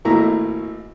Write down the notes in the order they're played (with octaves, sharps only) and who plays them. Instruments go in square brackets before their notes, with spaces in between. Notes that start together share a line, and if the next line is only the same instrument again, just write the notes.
[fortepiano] G#1 A2 A#3 E4 A4 A#5